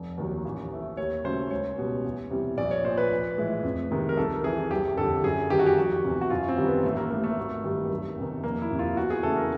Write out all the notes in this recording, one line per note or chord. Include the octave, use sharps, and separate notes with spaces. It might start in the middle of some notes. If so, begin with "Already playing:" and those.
Already playing: F1
D#2 D#3 F#3
A1
A2 E3 A3
D#2 C#5
C#3 F#3 A3 C5
C#2 C#5
B2 G3
E2
C3 E3 G3
A#1 D5
C#5
A#2 F3 C5
B4
A#1
A2 E3 G#3
F2
C3 D#3 G#3
A#4
C2 A4
C3 E3 G#4
F#1 G4
F2 D3 G3 A4
F#2 G#4
D#3 G3 G4
F#4
G4
F1 F#4
E2 C3
F#4
F#2 F4
C4
D#3 G3
B3
A1 A3
A#3
A2 E3 A3 A#3
A3
G#1
G2 D#3 G3
F#1
E2 C3 D#3
F1 A#3
E4
F2 C3
F4
E2 F#4
G#4
C#3 E3 A3 A4
A#4